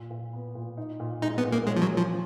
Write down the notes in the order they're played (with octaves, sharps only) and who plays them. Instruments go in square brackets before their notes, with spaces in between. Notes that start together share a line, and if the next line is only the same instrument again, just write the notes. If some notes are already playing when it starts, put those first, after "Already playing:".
Already playing: [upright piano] A#2
A#2
B3
A#2
D#4
A#2
[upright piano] G#3 [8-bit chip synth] D#4
[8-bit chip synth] B3
[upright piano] A#2
[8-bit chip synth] A#3
[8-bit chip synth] G#3 [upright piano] C#4
[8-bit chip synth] F3
F#3
[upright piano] A#3
[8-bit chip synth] F3